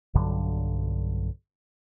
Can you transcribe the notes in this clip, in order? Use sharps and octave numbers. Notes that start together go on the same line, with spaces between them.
B1 G2 D3 F#3